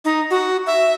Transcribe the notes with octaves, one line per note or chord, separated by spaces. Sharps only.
D#4
F#4
E5